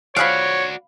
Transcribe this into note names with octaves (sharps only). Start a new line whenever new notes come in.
F3 F#4 G#4 C#5 D5 F5 F#5 B5